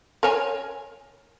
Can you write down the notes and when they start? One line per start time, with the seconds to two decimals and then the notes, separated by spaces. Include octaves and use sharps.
0.23 A#4 C#5 G#5